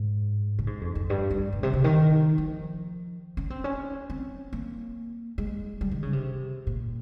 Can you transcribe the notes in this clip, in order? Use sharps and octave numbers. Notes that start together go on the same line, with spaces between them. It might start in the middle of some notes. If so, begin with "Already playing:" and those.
Already playing: G#2
A#2
G#2
F2
F2
G2
G2
A#2
C3
C3
D#3
F3
C#4
C4
C#4
C4
A#3
G#3
G3
D#3
C#3
C3
A#2